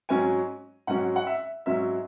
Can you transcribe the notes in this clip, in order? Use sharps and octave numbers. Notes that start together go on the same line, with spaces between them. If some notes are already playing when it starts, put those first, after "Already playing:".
G#2 F#3 C#4 G#5
G#2 F#3 C#4 F#5
F#5
E5
G#2 F#3 C#4 E5